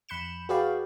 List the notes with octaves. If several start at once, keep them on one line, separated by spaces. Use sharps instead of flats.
F2 B5 F#6 G6 C#7 E7
F#4 G#4 B4 D5 F5 G5